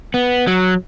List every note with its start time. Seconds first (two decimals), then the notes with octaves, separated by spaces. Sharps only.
0.14 B3
0.47 F#3